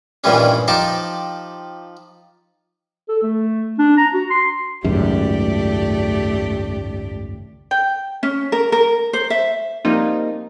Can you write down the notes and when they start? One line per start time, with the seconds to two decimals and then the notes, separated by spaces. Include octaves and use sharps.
0.24 G2 A#2 D#3 E3 G3 C#4
0.68 F3 D#4 G4 A5 D6
3.09 A4
3.22 A3
3.78 D4
3.97 A#5
4.14 F#4
4.30 C6
4.84 G#1 C#2 F#2 A3 G4 D5
7.71 G5
8.23 C#4
8.52 A#4
8.72 A#4
9.13 C5
9.30 E5
9.85 F3 G3 A#3 C4 D#4 F4